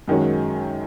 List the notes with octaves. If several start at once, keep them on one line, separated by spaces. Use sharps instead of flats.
F#2 D#3 G#3 C#4 F#4